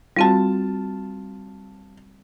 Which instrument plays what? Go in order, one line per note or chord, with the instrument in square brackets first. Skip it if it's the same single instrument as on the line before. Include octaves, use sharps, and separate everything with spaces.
[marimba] G3 C4 F#4 [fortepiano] F4 A5